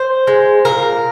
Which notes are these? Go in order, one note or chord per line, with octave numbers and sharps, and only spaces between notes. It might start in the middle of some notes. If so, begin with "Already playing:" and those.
Already playing: C5
G#3
A#2 A#4